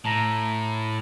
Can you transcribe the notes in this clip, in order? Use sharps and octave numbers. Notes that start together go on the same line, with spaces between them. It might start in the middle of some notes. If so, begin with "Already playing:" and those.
A2 A5 A#5 A#6